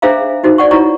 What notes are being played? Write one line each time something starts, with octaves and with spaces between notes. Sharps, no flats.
D4 G#4 C5 E5 F5 A#5
D#4 F#4 C5
D5 F#5 C#6
E4 F4 C#5 A#5 C#6